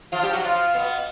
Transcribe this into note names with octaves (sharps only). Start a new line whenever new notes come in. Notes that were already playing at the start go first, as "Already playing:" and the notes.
F3 F4
G3 G4
F#3 F#4
F3 F4
B2 B3